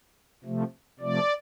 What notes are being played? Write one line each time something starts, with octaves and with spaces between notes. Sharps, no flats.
C3 F3 A3
C3 F3 A3 D5